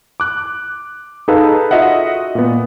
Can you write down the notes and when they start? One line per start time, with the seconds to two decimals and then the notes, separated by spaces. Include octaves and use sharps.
0.20 D6 F#6
1.28 D#4 G#4 A4 B4 F5
1.71 F4 F#4 D#5 E5 F#5
2.35 A#2 B3